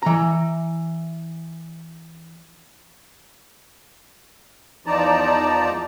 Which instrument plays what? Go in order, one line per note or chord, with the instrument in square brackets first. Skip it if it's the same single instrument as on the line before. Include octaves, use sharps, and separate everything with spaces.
[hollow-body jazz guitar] E3 A#5
[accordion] E2 F3 D#4 D5 A5 A#5